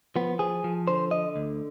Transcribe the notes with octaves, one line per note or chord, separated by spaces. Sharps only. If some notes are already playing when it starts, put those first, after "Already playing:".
F3 B3
F3 G#4
F3
D3 C5
D3 D#5
D2